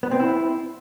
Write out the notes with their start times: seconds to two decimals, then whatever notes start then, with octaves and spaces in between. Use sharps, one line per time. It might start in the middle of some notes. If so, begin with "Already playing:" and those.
0.03 B3
0.11 C4
0.20 E4